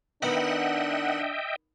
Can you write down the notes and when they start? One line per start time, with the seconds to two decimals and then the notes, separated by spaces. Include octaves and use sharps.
0.22 D#3 B3 D4 D#5 E5 F#5 G5